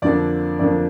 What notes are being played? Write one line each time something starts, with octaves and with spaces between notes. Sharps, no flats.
F2 D3 A#3 D4 D5
F2 D3 A#3 D4 D5